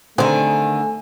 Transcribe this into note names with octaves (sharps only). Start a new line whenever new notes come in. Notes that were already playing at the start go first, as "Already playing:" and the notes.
D3 D#3 G3 A3 C4 G#4 G#5